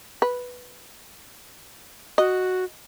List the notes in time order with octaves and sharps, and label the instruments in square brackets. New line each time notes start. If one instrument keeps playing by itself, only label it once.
[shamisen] B4
[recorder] F#4 [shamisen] D#5